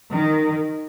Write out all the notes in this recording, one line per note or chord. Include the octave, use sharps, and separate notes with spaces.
D#3